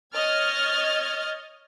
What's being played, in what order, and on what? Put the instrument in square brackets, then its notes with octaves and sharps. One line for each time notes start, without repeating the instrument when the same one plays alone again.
[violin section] C#5 D#5 F6 G#6 A6